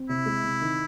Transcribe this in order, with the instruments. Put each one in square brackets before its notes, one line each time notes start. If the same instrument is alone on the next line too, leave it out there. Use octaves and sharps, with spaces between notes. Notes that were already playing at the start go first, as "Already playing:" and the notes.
Already playing: [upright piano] C4
[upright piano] C3 [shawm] E4
[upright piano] G#3
C3
D#3